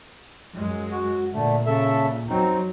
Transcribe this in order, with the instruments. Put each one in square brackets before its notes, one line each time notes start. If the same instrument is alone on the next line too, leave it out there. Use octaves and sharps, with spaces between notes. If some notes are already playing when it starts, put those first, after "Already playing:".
[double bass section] F#2 F#3 G#3
[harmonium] F#4
[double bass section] A#2 [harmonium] D3 A3
[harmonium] C#3 A4 E5
[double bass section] F#2 F#3 [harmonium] C4 D#4